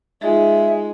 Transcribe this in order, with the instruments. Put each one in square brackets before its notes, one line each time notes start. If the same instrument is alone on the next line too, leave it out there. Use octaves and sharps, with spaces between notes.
[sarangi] G#3 [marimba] D#4 F4 [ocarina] E5